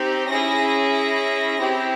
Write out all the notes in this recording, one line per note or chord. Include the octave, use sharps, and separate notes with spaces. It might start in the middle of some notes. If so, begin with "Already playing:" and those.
Already playing: C4 D#4 G4
C#4 E4 G#4 A#6
A#6
C4 E4 G4